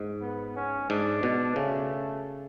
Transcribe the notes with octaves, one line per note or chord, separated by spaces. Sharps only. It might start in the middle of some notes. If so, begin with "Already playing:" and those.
Already playing: G#2
B3
C#4
G#2 D4
B2
C#3 A3